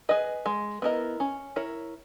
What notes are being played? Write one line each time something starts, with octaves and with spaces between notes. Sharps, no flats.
G#4 B4 D#5
G#3
B3 E4 A#4 D#5
C#4
E4 A#4 C#5